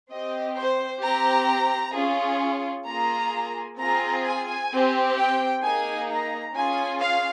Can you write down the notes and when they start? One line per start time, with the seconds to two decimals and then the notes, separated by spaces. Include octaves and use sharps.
0.11 C4 G4 D#5
0.57 C5
1.03 C4 G4 A#5
1.95 C#4 F4 G#4
2.87 A#3 F4 G#4 A#5
3.79 C4 F4 G#4 A#5
4.25 G#5
4.71 C4 G4
5.18 G5
5.63 A#3 D#4 G#4 G#5
6.10 A#5
6.55 C#4 F4 G#4 G#5
7.01 F5